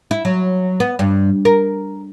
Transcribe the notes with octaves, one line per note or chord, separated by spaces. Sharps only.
E4
F#3
B3
G2
A#4